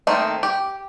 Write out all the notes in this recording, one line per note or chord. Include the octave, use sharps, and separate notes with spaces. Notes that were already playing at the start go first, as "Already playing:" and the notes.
D#3 A3 A#3 C4 D#4
G4